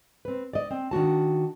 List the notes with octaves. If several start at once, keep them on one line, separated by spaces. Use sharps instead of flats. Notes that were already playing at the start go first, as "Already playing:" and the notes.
C4 B4
D5 D#5
C4
D#3 D4 F#4 A5